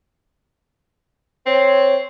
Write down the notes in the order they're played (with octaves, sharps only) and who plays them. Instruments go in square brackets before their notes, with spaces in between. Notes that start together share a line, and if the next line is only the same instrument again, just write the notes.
[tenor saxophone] C4 [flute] C#5